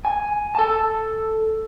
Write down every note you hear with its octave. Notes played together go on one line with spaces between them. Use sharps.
G#5
A4 A5